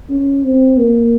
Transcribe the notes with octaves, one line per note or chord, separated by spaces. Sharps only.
C#4
C4
A#3